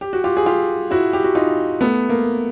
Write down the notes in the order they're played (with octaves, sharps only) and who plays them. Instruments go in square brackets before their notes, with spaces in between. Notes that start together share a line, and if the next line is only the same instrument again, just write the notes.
[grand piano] G4
F#4
F4 G4
G#4
F4 G4
E4 F#4
G4
F#4
D#4 F4
A3 B3
A#3